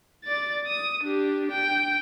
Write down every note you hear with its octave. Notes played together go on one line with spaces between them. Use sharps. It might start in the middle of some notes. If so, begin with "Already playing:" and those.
D5 A6
D#6
D4 G4
G5